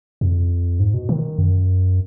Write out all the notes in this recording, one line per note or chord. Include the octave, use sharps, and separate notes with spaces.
F2
G#2
B2
D#3
F#2